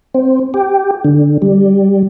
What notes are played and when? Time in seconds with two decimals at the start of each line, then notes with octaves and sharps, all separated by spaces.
0.14 C4
0.54 G4
1.04 D3
1.42 G3